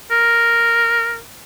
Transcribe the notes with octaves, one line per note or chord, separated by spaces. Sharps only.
A#4